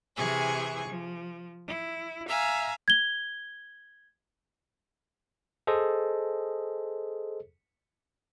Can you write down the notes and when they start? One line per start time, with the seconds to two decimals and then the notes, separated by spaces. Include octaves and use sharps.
0.17 C3 E3 G#4 G#5 C#6
0.87 F3
1.66 E4
2.29 E5 F5 G#5 A#5
2.88 G#6 G7
5.67 G#4 A4 C5 D#5